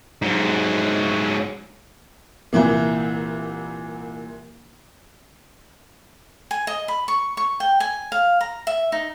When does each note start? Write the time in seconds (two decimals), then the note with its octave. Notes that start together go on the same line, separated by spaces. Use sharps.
0.22 G#2 F#3
2.53 C2 A#2 E3 A#3
6.51 G#5
6.67 D#5
6.88 B5
7.08 C#6
7.37 C#6
7.60 G5
7.80 G#5
8.12 F5
8.41 A#5
8.67 E5
8.92 D#4